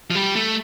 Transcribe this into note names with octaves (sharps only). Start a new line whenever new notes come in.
F3
G3
A3